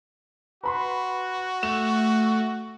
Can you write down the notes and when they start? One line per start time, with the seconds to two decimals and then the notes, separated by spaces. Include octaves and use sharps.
0.64 F#4 B4 B5 C6
1.63 A3 E7